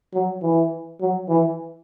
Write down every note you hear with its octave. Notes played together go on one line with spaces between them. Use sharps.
F#3
E3
F#3
E3